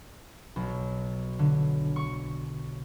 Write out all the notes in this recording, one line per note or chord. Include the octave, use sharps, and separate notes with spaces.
B1
D3
C#6